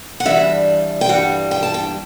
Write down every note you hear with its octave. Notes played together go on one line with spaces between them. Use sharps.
F#5
G2 E3 G3 D4 E5
G5
G2 E3 G3 D4 F#5
G5
A5
G5